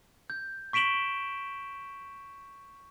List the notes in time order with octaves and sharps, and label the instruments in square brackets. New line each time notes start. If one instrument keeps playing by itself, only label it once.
[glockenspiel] G6
C#6 B6 D7 E7 F#7 G7